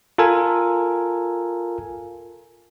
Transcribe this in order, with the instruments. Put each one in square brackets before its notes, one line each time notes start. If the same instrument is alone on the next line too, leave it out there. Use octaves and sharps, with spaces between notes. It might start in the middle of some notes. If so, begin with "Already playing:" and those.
[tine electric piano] F4 A4 A#4 G#5